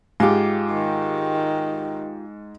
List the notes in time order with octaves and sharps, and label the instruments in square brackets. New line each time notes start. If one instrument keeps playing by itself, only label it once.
[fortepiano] G#2 D6 [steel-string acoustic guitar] F4 G4
[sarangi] D#3